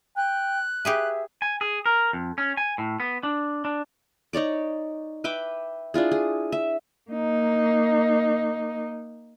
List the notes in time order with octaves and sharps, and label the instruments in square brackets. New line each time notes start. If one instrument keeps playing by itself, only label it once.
[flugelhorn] G5 [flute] F#6
[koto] G4 G#4 B4 [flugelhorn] E5
[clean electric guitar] G#5
G#4
A#4
F2
C#4
G#5
A2
B3
D4
D4
[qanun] D#4 C#5 D5 D6
B4 E5 G5 D6
D4 E4 F4 G#4
G#4
E5
[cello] A#3 D#4